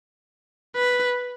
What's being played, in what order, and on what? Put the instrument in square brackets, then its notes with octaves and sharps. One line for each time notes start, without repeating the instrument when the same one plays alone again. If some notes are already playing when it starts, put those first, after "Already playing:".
[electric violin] B4